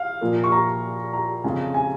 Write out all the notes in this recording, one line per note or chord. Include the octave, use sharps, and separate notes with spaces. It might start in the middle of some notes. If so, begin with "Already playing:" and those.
Already playing: F5
A#2 F3 A#3
C#6
A#5
A#5
F2 C#3 G#3
G#5